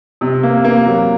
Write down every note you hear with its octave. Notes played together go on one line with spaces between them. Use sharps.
C3
A#3
A#3
F#3